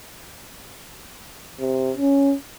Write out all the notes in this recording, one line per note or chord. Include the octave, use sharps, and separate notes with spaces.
C3
C#4